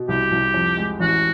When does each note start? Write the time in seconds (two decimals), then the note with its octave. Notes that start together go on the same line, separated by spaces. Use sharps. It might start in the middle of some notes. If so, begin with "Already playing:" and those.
Already playing: B2
0.08 C2 G4
0.31 C2
0.54 F2
0.77 G#3
1.00 A1 F#4